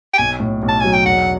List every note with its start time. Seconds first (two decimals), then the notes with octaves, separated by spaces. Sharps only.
0.14 G5
0.18 B1 G#5
0.40 A2
0.62 B1
0.69 A5
0.81 F#3 G#5
0.93 G5
1.05 E1 F#5